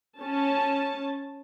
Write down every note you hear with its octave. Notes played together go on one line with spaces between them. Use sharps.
C#4 A5